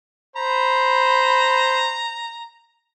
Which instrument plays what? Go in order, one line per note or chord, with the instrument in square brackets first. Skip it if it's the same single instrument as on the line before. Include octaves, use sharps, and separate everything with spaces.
[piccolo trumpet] C5 [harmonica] A#5 [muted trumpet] B5